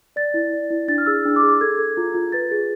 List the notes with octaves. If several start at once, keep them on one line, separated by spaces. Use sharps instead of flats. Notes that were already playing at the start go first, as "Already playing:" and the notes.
D5 A6
E4
D5
E4
D4 A6
F6
G#4 E6
D4
D6
G#4
D6
A4 G#6
A4
F4
F4
B4 A6
G#4